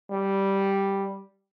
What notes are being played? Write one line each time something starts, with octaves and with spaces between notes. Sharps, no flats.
G3